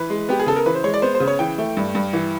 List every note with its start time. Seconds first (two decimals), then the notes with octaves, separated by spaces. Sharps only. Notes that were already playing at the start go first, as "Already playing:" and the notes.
Already playing: E3 B4
0.10 G#3
0.29 B3 G4
0.40 G#4
0.46 C#3 A4
0.56 A#4
0.66 E3 B4
0.75 C5
0.84 G#3 C#5
0.94 D5
1.02 B3 C5
1.15 C5
1.20 C#3
1.28 C#5
1.39 E3 G5
1.58 A3
1.77 G2
1.95 G2
2.13 E3